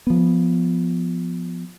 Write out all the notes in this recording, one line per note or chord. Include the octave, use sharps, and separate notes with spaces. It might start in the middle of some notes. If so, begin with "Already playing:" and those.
F3 B3